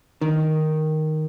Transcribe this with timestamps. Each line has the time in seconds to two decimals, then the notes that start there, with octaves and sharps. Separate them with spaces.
0.21 D#3